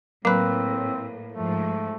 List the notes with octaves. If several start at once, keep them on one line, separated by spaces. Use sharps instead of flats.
A2 F#3 A#3 C4 B4
G#2 F3 A3